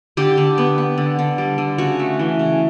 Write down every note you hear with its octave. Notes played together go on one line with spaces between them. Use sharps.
D3 G4
D3
B3
B3
D3
D3
G3
D3
C#3 F#4
A3
E3
C#3